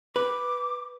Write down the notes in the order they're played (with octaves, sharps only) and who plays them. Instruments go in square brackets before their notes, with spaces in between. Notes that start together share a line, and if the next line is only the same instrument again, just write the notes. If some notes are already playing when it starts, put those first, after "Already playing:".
[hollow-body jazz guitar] B4 [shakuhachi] D6